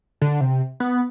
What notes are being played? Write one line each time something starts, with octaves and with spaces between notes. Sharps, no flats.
D3
C3
B3